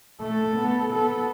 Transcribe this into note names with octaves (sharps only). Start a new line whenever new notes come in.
A3 A4
B3
B3 A4